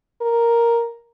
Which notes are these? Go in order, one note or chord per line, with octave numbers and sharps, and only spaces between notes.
A#4